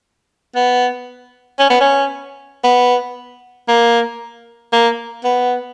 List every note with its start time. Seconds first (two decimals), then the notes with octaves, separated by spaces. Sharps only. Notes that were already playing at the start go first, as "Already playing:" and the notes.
0.55 B3
1.59 C#4
1.70 B3
1.80 C#4
2.64 B3
3.68 A#3
4.73 A#3
5.24 B3